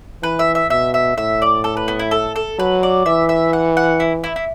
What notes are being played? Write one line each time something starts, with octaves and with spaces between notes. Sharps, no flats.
E3 B4
E5
E5
B2 E5
E5
A2 E5
D5
A4
B4
B3
E4
A4
A4
F#3 B4
D5
E3 E5
E5
F#5
F#5
E4
E4
E4